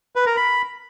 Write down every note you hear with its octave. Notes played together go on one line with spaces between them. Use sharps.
B4
A#4
B5